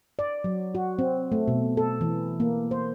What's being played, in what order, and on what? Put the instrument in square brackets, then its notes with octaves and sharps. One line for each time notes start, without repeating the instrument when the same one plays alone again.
[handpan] D5
F#3
F#4
C4
A3
B2
A4
E3
A#3
C5